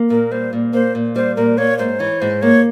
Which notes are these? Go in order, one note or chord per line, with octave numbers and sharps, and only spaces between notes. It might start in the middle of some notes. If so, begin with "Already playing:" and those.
Already playing: A#3
A#2 A#4
G3 C5
A#2
A#3 C5
A#2
G3 C5
A#2 A#4
A#3 C#5
G#2 C5
E3 C#5
G#2 C5
A#3 C#5